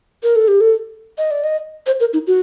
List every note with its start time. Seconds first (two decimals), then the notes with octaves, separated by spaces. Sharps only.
0.23 A#4
0.36 A4
0.48 G4
0.61 A4
1.18 D#5
1.31 D5
1.44 D#5
1.86 C5
2.00 A#4
2.13 D#4
2.27 F#4